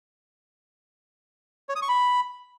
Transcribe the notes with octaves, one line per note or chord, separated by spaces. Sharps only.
C#5
D#6
C#6
B5